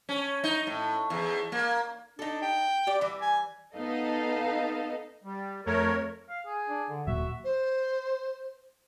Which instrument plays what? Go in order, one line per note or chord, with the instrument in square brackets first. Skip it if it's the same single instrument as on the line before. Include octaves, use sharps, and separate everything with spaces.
[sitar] C#4
D#4
A2
E2
A#3
[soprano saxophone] D4 [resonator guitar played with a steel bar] D#4 A4
[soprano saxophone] G5
[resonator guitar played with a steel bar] G4 D5
E3 G3
[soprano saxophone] G#5
[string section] B3 D#4 A4 D#5 F5
[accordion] G3
[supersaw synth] F2 A3 [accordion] A#4 C#5
[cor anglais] F5
G#4
[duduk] D4
D3
[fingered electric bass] D#1 A#2 F#3 [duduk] F#4 [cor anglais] E5
[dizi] C5